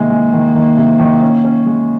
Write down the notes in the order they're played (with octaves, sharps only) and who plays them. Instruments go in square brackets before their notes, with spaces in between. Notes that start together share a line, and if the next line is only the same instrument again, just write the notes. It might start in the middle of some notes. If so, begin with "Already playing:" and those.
Already playing: [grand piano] C3 D#3 G#3 [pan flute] A#3
[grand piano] G#3
D#3
D#3
C3
D#3
C#4
C#4
G#3